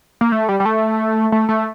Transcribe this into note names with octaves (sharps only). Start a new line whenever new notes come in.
A#3
A3
G3
G3
A3
A3
A3